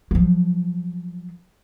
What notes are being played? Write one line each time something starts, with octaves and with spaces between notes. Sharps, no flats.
F3 F#3